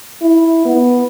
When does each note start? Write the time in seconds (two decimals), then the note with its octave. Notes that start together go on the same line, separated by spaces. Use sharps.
0.21 E4
0.65 B3